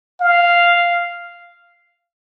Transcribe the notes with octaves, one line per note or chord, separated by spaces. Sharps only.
F5